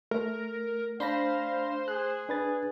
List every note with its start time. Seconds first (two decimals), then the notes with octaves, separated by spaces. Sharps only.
0.11 A3 A#4
1.00 D4 C5 F5 B5 A#6
1.88 G#4 F#6
2.29 D4 B4 A6